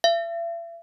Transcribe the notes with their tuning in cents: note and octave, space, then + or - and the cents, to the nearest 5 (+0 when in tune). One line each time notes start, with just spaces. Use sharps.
E5 +40